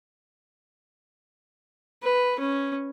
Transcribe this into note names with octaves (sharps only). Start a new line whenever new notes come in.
B4
C#4